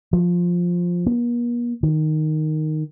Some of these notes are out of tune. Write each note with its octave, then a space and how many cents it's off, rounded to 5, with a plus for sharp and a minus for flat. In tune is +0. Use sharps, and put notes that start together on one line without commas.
F3 +5
A#3 +45
D#3 -5